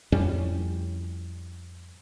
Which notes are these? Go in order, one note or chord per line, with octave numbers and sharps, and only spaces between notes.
F2 A2 G3 C#4